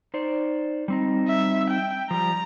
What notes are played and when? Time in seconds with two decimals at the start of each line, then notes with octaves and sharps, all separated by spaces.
0.14 D#4 C5 D5
0.88 G3 C4 D#4
1.29 E5
1.71 G5
2.11 F3 G3 A#5